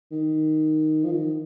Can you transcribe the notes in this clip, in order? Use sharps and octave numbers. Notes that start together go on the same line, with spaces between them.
D#3
F3
D#3